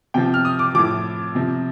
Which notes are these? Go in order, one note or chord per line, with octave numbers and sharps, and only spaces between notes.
C3 F3 G5
F6
D#6
D6
A2 F3 D6
C3 F3